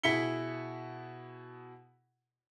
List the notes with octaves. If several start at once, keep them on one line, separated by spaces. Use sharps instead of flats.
B2 E4 G#4 B6 C#7 G7